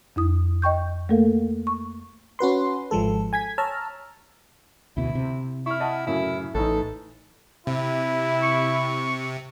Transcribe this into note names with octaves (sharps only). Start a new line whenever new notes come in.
F2 E4 D#6
D#5 G5 C#6 G6
A3 A#3 A4 A#4 F5
C#6
C#4 F#4 B4 C6
G#1 F3 G#3 A4
G#5 G#6 B6
C#5 A5 A#5 E6 F6
D2 B2 E4
C3
E4 C#6 F6
D#5 F#5 A5
F#2 A2 C#3 E4
A1 A2 E3 D#4 A4
C3 E4
C#6